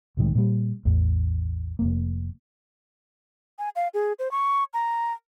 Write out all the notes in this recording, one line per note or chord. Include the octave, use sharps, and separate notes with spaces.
C2 A2 D#3 G#3
A#2 G3
A1 E2
F1 E2 A#3
G#5
F5
G#4
C5
C#6
A#5